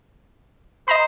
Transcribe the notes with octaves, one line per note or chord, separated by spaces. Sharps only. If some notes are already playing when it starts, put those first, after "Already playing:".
C5 D#5 A#5 B5